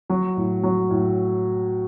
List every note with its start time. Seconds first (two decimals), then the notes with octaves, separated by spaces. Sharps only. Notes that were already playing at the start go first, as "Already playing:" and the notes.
0.10 F#3
0.37 A2
0.63 F#3
0.90 A2